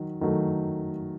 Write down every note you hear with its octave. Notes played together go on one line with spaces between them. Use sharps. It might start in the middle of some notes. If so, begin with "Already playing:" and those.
Already playing: D#3 F#3
D#3 F#3 A3